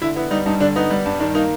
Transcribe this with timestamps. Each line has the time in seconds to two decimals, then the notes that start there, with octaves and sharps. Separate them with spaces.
0.01 D3 E4
0.16 B3 E4
0.31 G3 D#4
0.46 G2 D#4
0.60 D3 D4
0.76 B3 D#4
0.91 G3
1.05 G2
1.20 D#3 D4
1.35 A#3 D#4